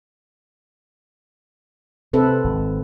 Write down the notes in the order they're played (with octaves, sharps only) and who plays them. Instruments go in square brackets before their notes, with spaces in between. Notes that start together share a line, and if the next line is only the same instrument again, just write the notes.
[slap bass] C3 [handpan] C4 A4 B4
[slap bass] G#1